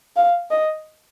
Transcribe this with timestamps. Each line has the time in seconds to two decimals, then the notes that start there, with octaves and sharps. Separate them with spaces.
0.16 F5
0.51 D#5